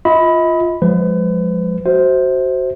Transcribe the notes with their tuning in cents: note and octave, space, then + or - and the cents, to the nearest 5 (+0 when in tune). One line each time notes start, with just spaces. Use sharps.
F4 +0 D#5 +40 B5 +0
F3 +30 G#3 +0 B4 +35
F#4 +20 C5 +0 E5 -25